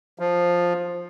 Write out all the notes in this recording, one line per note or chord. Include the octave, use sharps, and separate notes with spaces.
F3